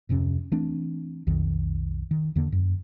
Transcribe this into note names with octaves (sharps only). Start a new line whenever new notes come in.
D1 F2 C3 C#4
E3 A3 C4 D4
B1 F2 D#3
D#3
E2 D3 A#3
F#2